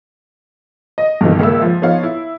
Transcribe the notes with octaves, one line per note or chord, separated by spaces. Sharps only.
D#5
G2 B2 D#3 E3
C#2 A#3 E5 E6
F3
F3 B3 D#4 C#5 F5
E4